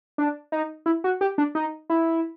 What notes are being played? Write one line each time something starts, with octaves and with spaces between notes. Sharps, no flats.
D4
D#4
E4
F#4
G4
D4
D#4
E4